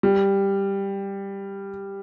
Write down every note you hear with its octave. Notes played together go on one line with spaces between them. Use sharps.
G3